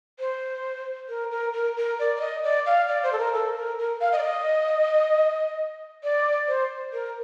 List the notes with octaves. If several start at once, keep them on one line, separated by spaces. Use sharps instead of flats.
C5
A#4
A#4
A#4
A#4
D5
D5
D#5
D5
F5
D5
C5
A4
A#4
A4
A#4
A#4
F5
D#5
D5
D#5
D5
C5
A#4